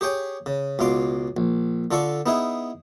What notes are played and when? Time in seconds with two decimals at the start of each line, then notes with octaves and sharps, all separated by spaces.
0.01 G4 G#4 C#5 G5 G#5
0.46 C#3
0.79 C#2 B2 F5 C6 D6
1.37 A#1
1.91 D3 F4 A4 D5 C#6
2.26 B3 D#4 E4 G#4